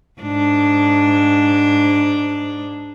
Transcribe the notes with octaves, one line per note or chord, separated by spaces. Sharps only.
G#2 D4